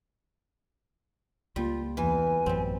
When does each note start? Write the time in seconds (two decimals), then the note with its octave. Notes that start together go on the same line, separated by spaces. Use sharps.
1.56 C#2 G3 A#3 F4
1.97 E2 E3 G#5
2.46 A1 F#2 G3 C4